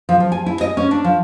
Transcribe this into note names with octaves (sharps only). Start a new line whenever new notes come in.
F3
F3
G#5
E4
D#5
C#4
D4
F3